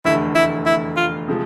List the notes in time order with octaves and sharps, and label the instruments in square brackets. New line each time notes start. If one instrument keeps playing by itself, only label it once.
[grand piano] F1 E2 D3 A3 [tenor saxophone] E4
[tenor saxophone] E4
E4
F4
[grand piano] C3 F3 G#3